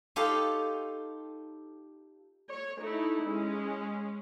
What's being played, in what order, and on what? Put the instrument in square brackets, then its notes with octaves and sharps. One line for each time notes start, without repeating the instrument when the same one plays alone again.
[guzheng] D#4 F4 G4 A4 C#5 F5
[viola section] C#5
A3 D#4 E4
G#3 C#4